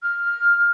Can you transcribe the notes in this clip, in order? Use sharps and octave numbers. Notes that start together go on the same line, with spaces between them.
F6